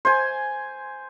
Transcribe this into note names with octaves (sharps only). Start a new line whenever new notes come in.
C5 G#5